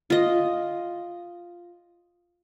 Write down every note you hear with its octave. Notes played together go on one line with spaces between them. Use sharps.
F4 D#5